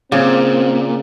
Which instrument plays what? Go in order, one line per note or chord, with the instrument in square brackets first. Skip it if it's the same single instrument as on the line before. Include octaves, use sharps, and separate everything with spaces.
[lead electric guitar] A#2 [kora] C#3 [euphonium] C4